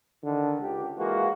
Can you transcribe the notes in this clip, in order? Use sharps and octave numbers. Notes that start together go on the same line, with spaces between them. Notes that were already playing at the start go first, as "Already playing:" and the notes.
D3 D#3
C#2 G4
E3 G#3 A#3 F4 F#4